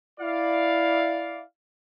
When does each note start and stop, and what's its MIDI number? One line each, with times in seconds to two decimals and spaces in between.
0.20 1.42 64
0.20 1.42 74
0.20 1.42 77